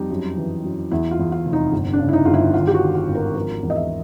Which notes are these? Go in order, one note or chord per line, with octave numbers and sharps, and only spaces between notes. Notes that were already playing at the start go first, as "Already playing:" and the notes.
Already playing: F2 G3 D#4
F#2
E3
F#2
E2 E4
F4
E2
F4
F1
D#4
G1
D4
C#3
E4
D#4
G1 F4
E4
D#3 F4
G4
F#4
D#3
F4
G#1
A#4
F3 A#4
E2
D#5
E5